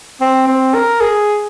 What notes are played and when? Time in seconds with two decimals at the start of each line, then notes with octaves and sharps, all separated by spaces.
0.21 C4
0.47 C4
0.74 A#4
1.01 G#4